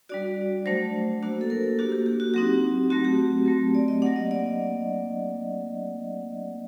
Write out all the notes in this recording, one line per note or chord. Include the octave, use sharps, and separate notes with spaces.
G3 D4 F#4 D5
F#3 A3 D4 C5
A#3 D4 F#4
A4
A#4
A4
A#3 D4 F#4 G4
G4
G4
F#4
F#3 C4 D#4 G4
F#3 A3 C4 F#4
G4
F#3 A3 C4
D5
D#5
F#3 A#3 D4 F#5
D#5
D5